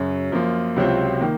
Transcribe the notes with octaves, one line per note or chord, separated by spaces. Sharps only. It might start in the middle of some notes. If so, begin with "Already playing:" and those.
Already playing: F#2 C#3 F#3
F#2 F3 A#3 F4
C#2 C3 F#3 C4 F4
D#3 A#3